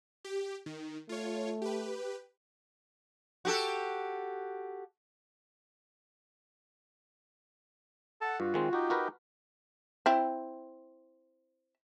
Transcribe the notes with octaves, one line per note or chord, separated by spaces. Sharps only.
G4
D#3
A3 F4 C#5
G4 B4
F#4 G4 A4
A4 F#5 A5
G2 F4 F#4
D#3 G#3 C4
D#4 F#4 G4
F#4 A#4 B4
C4 E4